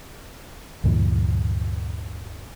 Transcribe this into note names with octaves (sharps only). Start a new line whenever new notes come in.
D2 G2 A#2 E3